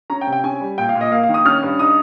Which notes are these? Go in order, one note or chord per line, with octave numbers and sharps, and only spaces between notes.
C#4 A#5
G5
C3
G5
C#4 G#5
G3
A#2 G5
F5
A#2
D#5
A#3 F5
F5
D#3
D#6
C#4 F6
G2
D#4 D#6